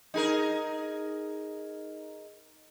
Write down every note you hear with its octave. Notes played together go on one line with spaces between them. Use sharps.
D#4 G#4 A#4